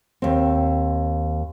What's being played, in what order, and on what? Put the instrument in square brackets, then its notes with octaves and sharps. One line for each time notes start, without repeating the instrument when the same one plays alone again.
[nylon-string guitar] D#2 C4